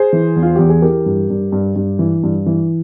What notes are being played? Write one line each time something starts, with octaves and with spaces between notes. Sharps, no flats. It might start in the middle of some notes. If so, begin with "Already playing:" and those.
Already playing: G#4 C5
E3
E2
F4
E2 G4
G#4
E3 G4 A#4
G2
G2
G2
G2
E3
G2
E3